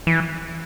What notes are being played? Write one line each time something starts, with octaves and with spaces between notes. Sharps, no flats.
E3